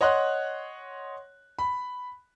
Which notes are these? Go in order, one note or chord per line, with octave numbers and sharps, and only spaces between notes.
C#5 D#5 F#5 C6 F#6
B5